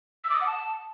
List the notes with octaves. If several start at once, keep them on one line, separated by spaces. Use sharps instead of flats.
E6
D6
D#6
F#5
A5